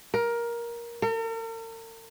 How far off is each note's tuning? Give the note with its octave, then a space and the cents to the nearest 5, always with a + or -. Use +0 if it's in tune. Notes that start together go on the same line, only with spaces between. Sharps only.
A#4 +15
A#4 -45